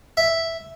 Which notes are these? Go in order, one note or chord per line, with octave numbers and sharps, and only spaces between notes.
E5